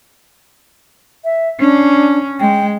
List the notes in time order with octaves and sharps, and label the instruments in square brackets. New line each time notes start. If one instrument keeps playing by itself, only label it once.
[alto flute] E5
[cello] C#4 [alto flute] D4
[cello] G#3 [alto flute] G5